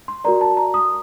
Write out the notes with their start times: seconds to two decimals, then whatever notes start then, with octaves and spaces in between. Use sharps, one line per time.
0.08 C6
0.24 F#4 A#4 D5 A#5
0.41 A5
0.57 A#5
0.74 D#6